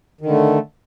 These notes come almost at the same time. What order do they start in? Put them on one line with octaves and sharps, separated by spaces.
D#3 D3 A3